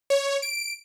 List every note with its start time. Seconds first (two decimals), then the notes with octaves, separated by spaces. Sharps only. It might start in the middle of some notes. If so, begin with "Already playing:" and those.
0.10 C#5
0.42 D7